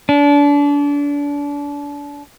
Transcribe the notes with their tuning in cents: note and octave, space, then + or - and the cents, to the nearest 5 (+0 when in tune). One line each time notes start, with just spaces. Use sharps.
D4 -30